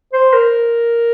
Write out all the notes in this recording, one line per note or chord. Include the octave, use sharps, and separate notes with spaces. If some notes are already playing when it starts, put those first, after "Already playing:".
C5
A#4